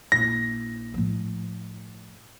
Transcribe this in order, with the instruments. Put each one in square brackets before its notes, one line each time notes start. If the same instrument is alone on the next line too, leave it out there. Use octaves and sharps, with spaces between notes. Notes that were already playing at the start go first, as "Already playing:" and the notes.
[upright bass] A#1 E4 [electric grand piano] A#6
[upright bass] A2 F3